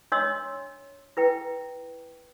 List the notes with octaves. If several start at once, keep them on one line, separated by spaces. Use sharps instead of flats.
D4 C#5 D#5 C6 E6
E4 B4 G5